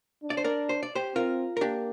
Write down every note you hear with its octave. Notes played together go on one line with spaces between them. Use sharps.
D4
D5
C5
A#4 D5
C5
D5
G4 C5
C4 F4 A#4
A#4
A#3 D4 G4